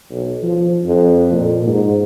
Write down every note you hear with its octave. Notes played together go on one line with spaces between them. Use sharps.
B1
F3
F2
A#2
G#2